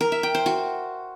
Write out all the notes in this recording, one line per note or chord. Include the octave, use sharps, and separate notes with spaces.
A#4
E5
G5
C5
F#4